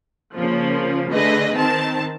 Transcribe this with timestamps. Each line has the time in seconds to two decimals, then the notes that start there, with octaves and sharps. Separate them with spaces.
0.36 C#3 F3 A#3
1.11 D3 A3 G#4 B4 D#5
1.54 D#3 C4 A5